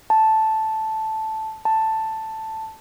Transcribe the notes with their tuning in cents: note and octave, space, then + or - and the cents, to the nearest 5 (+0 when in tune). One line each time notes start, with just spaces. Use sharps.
A5 -5
A5 +5